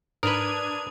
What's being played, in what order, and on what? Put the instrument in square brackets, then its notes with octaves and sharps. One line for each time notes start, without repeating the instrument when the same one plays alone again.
[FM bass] G#2 [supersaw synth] D4 G#6 D#7 [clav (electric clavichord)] A#4 B4 [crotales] D#6 F7